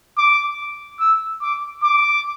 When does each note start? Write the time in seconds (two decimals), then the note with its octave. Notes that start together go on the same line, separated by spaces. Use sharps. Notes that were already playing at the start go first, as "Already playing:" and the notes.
0.18 D6
1.00 E6
1.42 D6
1.83 D6